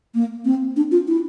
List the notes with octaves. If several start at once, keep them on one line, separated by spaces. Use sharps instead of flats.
A#3
C4
D4
F4
E4